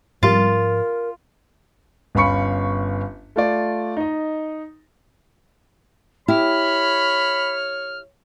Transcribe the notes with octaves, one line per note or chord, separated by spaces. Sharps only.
G#2 F3 G3 C4 F4 A#4 A6
G1 C#4 F5 B5 C#6 C#7
A3 F4 D5
D#4 D#5
E4 G4 C#5 B5 F6